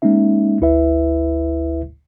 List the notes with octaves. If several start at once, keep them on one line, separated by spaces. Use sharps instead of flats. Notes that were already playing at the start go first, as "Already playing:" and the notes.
G#3 A#3 C#4 D#4 E5
G1 D2 E4 B4 E5